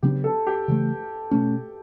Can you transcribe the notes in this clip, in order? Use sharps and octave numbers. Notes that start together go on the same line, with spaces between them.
C#3 F#3 B3 D4 G4
A4
G4
C#3 E3 A3
B2 A3 C#4